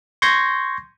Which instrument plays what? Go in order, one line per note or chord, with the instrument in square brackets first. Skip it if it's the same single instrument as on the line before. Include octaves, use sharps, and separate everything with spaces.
[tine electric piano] C6 C#6 G6 G#6 A#6